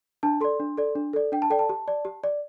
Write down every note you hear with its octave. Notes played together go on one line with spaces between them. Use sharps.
D4 A5
A4 D5 C6
D4
A4 D5
D4
A4 D5
D4 G5
A5
A4 D5 G5
A5
G4
D5
G4
D5